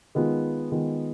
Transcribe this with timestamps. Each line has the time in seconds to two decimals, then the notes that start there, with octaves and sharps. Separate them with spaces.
0.15 D#3 G#3 B3 F4
0.72 D#3 G#3 B3 F4